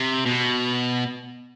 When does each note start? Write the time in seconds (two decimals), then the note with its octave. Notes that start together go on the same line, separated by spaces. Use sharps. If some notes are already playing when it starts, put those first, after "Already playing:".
Already playing: C3
0.26 B2